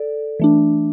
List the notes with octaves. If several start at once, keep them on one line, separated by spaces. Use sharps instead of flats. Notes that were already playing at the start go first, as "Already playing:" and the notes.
Already playing: A4 D5
E3 A3 D4